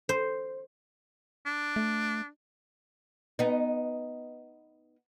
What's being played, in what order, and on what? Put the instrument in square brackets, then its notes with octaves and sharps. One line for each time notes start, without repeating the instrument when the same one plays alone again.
[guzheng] C5
[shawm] D4
[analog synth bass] A3
[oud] B3 D#4